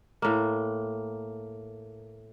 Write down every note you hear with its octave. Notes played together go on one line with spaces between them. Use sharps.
A2 A#3